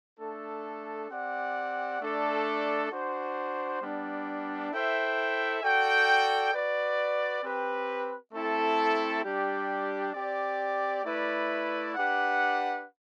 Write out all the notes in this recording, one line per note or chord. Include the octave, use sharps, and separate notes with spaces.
A3 D4 A4
C4 G4 D5 F#5
A3 D4 A4 D5
D4 F#4 C5
G3 B3 D4
E4 A4 C5 E5 G5
F#4 A4 D5 G5
F#4 B4 D5
C4 G4 B4
A3 C4 E4 A4
G3 D4 G4
C4 G4 D5
A3 E4 B4 D5
D4 G4 B4 F#5